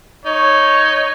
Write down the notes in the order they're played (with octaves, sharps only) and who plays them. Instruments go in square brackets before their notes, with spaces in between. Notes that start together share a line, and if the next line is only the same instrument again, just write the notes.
[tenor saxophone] D#4 [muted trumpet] C#5